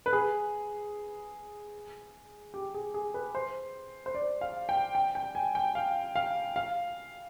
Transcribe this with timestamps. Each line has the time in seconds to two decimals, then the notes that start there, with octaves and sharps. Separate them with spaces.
0.06 B4
0.13 G#4
2.54 G4
2.74 G#4
2.94 G#4
3.14 B4
3.35 C5
4.06 C5
4.15 D5
4.41 F5
4.69 G5
4.95 G5
5.15 G5
5.35 G#5
5.55 G5
5.75 F5
6.16 F5
6.56 F5